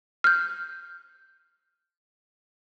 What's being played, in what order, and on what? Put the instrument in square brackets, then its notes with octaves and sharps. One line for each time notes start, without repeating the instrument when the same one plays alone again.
[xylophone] F6 G6